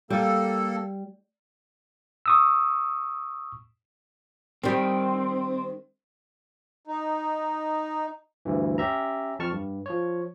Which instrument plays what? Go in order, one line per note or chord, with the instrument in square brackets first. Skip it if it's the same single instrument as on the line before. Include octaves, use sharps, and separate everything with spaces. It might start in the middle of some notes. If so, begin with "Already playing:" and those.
[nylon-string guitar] G3 [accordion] A#3 A4
[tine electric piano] C#6 D#6 E6
[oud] D#3 G3 [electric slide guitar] C4
[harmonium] D#4
[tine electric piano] D2 G2 E3
C#4 G4 E5 A#5
F2 A5 C#6 F6
G2
F3 C#5